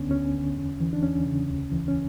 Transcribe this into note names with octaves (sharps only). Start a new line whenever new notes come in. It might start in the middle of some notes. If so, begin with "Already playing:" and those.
Already playing: D2 D3 B3 C#4 D4
D2 C#4
D3
E2
E3
D4
E2 C#4
C#3
D2
E3
C#4